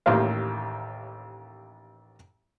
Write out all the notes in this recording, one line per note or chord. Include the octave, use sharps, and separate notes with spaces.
A1 D#2 A2 A#3 C5 F5